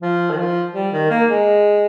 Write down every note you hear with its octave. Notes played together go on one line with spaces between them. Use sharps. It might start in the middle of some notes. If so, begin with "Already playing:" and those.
F3
D#3
F3
G3
D#3
A#3
G#3